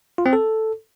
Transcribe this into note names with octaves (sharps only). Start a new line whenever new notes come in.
F4
C4
A4